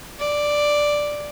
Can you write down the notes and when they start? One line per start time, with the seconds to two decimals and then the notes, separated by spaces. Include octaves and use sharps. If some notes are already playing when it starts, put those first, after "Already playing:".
0.19 D5